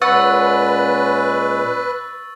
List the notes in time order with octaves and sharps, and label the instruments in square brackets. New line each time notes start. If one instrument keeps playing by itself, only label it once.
[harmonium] A#2 G#3 C#4 [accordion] B4 [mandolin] F#5 [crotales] C#6 E6 A6